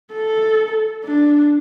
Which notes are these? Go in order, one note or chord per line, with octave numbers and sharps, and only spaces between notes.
A4
D4